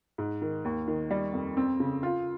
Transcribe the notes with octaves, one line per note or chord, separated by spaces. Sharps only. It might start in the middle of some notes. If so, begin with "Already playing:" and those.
G#2
D#3
D#2
D#3
G3
F2
C4
C#3
F4